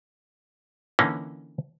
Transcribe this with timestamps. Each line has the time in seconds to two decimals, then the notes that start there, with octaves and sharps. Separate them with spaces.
0.99 D3 E3 A#3 C#4 D#4